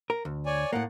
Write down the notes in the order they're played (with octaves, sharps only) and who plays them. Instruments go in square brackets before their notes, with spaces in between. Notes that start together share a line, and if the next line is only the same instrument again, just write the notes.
[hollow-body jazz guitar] A#4
D2
[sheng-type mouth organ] C#5 D5 G#5
[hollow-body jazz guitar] A2 A#3 [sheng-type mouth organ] F#5